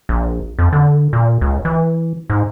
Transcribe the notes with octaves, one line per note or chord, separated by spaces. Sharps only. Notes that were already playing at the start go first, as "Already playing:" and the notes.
A#1
F2
D3
A#2
C#2
E3
G#2